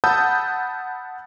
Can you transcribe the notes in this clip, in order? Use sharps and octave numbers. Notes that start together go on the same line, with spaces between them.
F#5 A5 B5 D#6 E6 G6